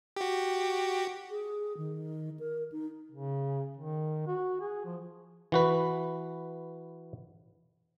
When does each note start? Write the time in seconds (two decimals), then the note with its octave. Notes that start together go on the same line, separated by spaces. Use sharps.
0.17 F#4 G4
1.31 G#4
1.77 D#3
2.39 A#4
2.72 D#4
3.12 C#3
3.77 D#3
4.27 F#4
4.61 G#4
4.85 F3
5.52 E3 F#4 B4